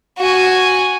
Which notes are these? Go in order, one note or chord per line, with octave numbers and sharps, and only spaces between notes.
F#4 G#5